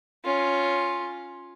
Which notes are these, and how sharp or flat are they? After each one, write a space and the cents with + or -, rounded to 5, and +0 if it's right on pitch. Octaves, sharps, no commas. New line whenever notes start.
C#4 +0 F4 +10